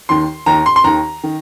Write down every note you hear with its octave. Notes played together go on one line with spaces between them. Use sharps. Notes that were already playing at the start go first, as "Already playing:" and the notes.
D#2 D#3 C6
D#2 D#3 A#5
C6
C6
D#2 D#3 A#5
D#3